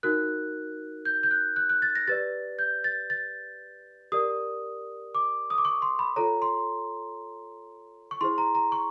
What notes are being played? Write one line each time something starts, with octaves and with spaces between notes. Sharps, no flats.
D#4 F#4 A#4 F#6
G6
G6
F#6
F#6
F#6
A6
A#6
G4 B4 D5 A6
G6
A6
A6
G4 A#4 D5 D#6
D6
D#6
D6
C#6
C6
B5
F4 A4 C#5 A#5
C6
C#6
E4 G#4 C5 C6
A#5
A#5
C#6